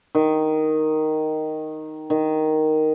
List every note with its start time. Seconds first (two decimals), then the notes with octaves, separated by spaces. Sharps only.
0.15 D#3
2.10 D#3